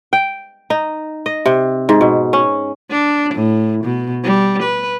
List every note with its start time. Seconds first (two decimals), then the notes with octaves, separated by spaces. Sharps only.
0.13 G5
0.70 D#4
1.26 D#5
1.46 C3
1.89 G#2
2.01 B2
2.33 C#4
2.91 D4
3.34 A2
3.84 B2
4.24 G3
4.62 B4